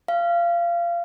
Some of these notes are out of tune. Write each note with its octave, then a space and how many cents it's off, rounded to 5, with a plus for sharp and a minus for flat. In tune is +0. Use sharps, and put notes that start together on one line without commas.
F5 -25